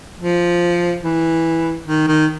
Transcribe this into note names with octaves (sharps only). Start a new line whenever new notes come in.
F3
E3
D#3
D#3